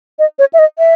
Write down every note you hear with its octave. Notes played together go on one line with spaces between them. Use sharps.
D#5
C#5
E5
D#5
E5